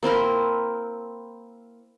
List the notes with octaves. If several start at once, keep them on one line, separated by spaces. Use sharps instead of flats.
A#3 C4 E4 A#4